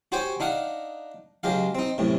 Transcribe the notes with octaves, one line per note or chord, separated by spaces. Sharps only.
F#4 G4 C5 C#5 G5 G#5
D4 D#4 F5 F#5
C#2 F#3 G#3 G4 F5
C4 D#4
F#2 A2 C3